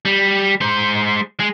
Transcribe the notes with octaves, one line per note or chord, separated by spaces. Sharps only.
G3
G#3 C5
G#3